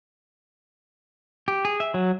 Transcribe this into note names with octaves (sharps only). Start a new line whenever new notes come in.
G4
G#4
E5
F#3